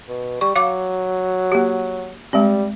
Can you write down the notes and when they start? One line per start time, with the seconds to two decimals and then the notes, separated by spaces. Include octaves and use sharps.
0.09 B2
0.41 G3 C#6
0.56 F#3 F5 D6
1.52 A#3 G4
2.33 G3 G#3 C4